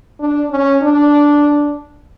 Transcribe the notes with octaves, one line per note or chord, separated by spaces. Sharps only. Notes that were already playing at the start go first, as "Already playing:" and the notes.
D4
C#4
D4